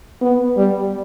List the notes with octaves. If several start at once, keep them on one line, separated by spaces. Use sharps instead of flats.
B3
G3